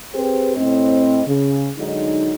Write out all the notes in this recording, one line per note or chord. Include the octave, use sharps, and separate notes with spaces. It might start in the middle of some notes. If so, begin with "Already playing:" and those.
C4 G4 G#4 B4 C5
A2 C4 D#5
C#3
D3 F#3 G#3 D#4